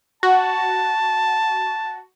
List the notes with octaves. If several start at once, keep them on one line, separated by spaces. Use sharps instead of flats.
F#4 A5